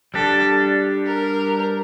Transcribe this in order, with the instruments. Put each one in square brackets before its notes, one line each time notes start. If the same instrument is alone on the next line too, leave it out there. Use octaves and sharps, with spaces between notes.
[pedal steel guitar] G3 D4 G4 [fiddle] A4
[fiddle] A#4